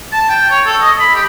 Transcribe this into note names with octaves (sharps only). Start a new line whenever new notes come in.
A5
G5
C#5
A4
D#5
B5
G4